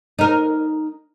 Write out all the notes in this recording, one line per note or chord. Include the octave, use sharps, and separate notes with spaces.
D#4 A#4